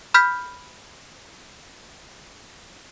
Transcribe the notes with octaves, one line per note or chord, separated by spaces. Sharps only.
B5 F6 G6 B6